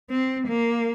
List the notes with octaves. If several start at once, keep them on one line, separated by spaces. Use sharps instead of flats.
C4
A#3